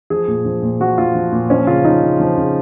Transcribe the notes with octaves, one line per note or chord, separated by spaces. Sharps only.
F3 G#4
A#2
F3
A#2
F3 F#4
A#2 F4
F3
A#2
F3 C#4
C#3 F4
F3 D#4
C#3
F3
C#3